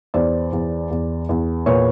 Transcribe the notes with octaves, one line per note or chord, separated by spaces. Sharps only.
E2 C5 D5
E2
E2
E2
A#2 B4 C#5